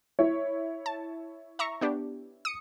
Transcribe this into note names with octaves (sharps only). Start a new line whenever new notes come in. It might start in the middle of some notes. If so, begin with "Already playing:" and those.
E4 C#5
A5
E5 A#5 C#6
B3 D4 G4
D#6 C#7